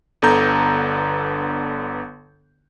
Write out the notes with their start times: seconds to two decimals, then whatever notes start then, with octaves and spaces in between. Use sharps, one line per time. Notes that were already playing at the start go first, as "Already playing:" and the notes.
0.22 G1 D3 B3 A4 A#5 G6